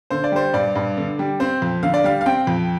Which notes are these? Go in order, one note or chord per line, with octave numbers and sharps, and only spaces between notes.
D3 C5
D5
G3 C5
G2 D5
G2
D3
G3
C4 C5
F2
D3 F5
D5
G3 F5
F5
C4 G5
F2